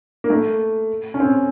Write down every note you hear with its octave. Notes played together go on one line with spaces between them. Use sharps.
A#3
A3
C#4
C4